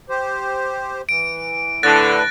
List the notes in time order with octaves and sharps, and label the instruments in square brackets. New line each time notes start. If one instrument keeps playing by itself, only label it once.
[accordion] G4 C5
[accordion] E3 [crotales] D7
[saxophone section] A2 D3 [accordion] D4 B4 [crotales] F#6 A6 A#6